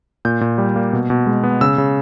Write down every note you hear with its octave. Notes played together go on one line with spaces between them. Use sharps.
A#2 G6
A#2
G3
A#3
B2
B2
G#3
B3
C#3 E6
C#3